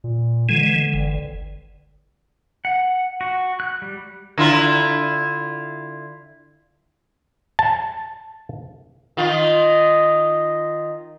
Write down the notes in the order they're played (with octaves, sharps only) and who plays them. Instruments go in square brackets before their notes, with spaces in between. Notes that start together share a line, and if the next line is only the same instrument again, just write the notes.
[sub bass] A#2
[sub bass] D3 [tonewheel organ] E3 G#3
[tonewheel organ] G1
[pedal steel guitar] F#5
F#4
F#6
G3
[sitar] D3 E4 F4
[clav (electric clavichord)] A5
[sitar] D#3 F4